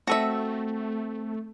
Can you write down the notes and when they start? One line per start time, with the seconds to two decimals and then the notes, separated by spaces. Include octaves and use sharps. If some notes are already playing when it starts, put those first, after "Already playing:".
0.07 A3 C4 F#4 A4 E5